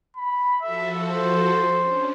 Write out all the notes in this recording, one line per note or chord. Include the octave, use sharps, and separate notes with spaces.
B5
F3 F#4 A4 E5
C5
C#4 D4